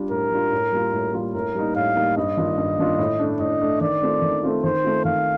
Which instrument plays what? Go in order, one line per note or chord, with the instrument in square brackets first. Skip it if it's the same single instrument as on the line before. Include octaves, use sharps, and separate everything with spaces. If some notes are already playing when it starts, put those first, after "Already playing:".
Already playing: [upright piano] G3 D4 F4
[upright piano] A2 [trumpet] A#4
[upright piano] G3 D4 F4
A2
G3 A#3 F4
A2
G3 A#3 F4
[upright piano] A2 [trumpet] A#4
[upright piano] G3 A#3 D#4
[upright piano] A2 [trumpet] F5
[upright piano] G3 A#3 D#4
[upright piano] G2 [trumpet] D#5
[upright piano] D#3 A#3 D4 F4
G2
D#3 A#3 D4 F4
A2
A3 D4
[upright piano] A2 [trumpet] D#5
[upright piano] A3 D4
[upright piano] D#3 [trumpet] D5
[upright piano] A3 C4 F4
D#3
A3 C4 F4
[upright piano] D#3 [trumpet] C5
[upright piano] A3 C4 F4
[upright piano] D#3 [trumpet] F5